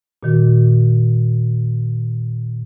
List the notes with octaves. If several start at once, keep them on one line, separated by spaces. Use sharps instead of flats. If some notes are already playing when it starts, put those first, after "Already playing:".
A#2 D#3 F#4